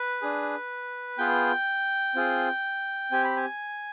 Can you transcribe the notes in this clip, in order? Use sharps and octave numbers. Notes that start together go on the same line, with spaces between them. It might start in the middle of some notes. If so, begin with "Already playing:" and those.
Already playing: B4
D4 G#4
B3 F4 G#4 G5
C4 F4 G#4
C4 G4 G#5
B5
G#5